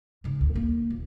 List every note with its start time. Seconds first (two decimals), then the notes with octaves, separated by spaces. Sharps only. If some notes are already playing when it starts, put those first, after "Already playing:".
0.24 G#2 C#3
0.41 D2
0.54 A#3 D4
0.90 D#1